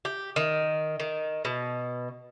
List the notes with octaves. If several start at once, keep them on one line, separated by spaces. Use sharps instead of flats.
G4
D#3
D#3
B2